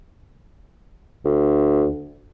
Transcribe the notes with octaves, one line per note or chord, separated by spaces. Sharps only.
D2